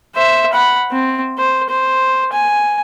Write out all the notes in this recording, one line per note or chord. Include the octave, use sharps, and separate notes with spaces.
C5 E5
F#5 B5
C4
C5
C5
G#5